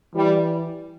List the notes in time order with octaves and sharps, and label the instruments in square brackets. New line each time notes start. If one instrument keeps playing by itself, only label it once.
[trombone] E3 [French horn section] G3